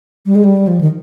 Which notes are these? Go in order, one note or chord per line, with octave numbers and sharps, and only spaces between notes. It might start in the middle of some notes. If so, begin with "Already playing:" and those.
G3
G#3
G3
F3
D#3